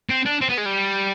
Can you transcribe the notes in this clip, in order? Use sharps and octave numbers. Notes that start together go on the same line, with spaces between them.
C4
D4
C4
B3
G#3
G3